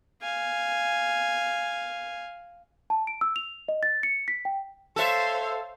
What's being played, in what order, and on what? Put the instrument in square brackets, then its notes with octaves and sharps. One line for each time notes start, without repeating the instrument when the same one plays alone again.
[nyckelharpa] F5 G#5
[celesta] A5
D7
E6
F7
D#5
A6
C#7
B6
G5
[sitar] A4 E5 [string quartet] C5 C#5 F5